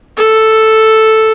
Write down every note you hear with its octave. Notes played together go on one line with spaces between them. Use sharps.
A4